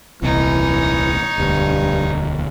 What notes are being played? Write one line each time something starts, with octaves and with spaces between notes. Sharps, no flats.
D#1 C2 C3 E3 D#4 C#5
E1 D2 G2